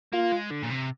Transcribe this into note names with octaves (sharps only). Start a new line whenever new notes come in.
A#3 F4
G#3
D3
A#2
C3